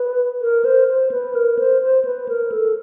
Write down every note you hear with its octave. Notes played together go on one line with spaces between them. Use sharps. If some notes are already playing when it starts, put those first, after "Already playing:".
Already playing: B4
A#4
C5
C5
B4
A#4
C5
C5
B4
A#4
A4